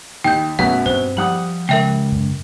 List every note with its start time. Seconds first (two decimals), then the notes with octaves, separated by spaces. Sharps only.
0.24 D#2 G5 G6
0.59 F#2 B2 F#3 A3 F#5
0.86 G2 C4 C5
1.17 F3 G3 F#5 D#6 F#7
1.69 C#2 A#4 E5 G5
2.12 F#2